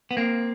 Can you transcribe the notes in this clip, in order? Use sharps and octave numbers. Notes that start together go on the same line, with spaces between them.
B3
A#3 C4